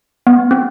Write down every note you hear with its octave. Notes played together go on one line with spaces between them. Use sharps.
B3
C4